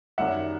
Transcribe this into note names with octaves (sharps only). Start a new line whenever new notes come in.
F#2 D#3 G3 E5 F#5